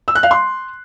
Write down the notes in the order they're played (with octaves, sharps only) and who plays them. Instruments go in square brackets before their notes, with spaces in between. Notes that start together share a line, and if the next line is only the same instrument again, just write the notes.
[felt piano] E6
F#6
F5
C6